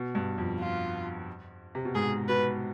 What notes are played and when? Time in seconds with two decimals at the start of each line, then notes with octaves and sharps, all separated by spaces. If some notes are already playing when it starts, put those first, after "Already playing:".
Already playing: B2
0.15 G2
0.38 F2
0.60 F4
1.75 C3
1.85 B2
1.95 G#2 G#4
2.28 B2 B4